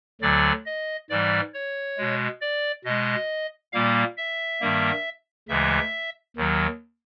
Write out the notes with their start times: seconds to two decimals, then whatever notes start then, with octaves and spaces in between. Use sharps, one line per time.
0.21 D2 D3 F#3 D5
0.66 D#5
1.10 G#2 E3 G3 D5
1.54 C#5
1.97 B2 G#3
2.41 D5
2.84 B2 G#3 D#5
3.72 A#2 G3 A#3 F5
4.17 E5
4.60 G2 D#3 G3 A#3
5.48 D2 C#3 E3 G#3 E5
6.37 D#2 D#3 F#3